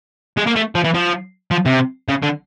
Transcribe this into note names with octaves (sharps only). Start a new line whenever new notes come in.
G#3
A#3
A3
F3
E3
F3
F3
C3
C#3
D3